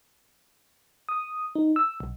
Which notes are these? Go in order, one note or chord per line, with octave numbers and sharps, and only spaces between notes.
D#6
D#4
E6
B1